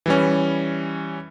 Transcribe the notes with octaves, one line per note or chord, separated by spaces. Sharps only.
E3 G3 C#4